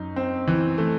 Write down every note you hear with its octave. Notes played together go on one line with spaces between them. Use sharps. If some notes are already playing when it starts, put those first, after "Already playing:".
Already playing: F#2 D#4
C4
E3
A3